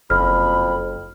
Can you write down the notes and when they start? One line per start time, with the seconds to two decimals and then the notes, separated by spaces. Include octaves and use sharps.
0.10 F#1 F2 B5 F6